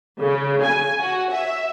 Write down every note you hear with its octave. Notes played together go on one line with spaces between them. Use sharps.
C#3
G#5
F#4
E5